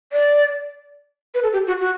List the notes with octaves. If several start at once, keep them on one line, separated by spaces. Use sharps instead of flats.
D5
B4
A4
G4
F#4
F#4